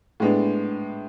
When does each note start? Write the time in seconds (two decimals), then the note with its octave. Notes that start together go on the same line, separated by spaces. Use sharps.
0.20 A2 G#3 B3 D4